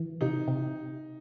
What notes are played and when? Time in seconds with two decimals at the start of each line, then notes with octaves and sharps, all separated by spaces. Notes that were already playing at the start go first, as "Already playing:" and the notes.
Already playing: E3
0.21 C3 D#4
0.48 C3